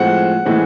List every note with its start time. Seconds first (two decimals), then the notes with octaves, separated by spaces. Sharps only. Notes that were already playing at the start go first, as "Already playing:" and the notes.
Already playing: A2 F3 G#3 C4 F#5
0.45 A2 E3 G#3 C4